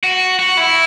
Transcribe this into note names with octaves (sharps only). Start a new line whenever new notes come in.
F#4
F#4
E4